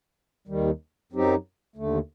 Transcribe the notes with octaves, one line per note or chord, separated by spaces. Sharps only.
D#2 D#3 G3
F#2 F#3 C4 D#4 G4
D#2 D3 A3